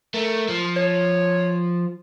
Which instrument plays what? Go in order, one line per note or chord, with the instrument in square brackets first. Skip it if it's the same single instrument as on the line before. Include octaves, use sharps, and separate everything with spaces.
[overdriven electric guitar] A3 [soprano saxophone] A#4
[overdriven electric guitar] F3
[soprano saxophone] C#5